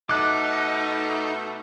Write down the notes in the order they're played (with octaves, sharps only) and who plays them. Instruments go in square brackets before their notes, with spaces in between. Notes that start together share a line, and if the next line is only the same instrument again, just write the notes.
[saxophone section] B2 A3 [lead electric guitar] D#4 [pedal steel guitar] D6 F#6